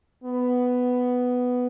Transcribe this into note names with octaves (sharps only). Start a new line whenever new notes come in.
B3